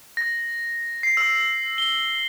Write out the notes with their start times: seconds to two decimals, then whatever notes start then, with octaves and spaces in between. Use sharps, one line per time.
0.17 A#6
1.03 C7
1.17 E6
1.78 G7